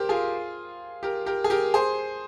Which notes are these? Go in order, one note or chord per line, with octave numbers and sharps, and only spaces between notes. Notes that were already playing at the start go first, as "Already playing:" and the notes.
Already playing: G4 A#4 C5
F4 G#4
G4 A#4
G4 A#4
G#4
G4 A#4
G#4 C5